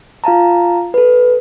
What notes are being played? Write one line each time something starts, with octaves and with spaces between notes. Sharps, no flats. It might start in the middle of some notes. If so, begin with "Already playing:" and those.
F4 F5 A5 A#5
A4 B4